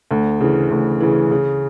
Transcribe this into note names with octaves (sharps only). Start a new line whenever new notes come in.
D2
C#3 E3
D2
C#3 E3
C#3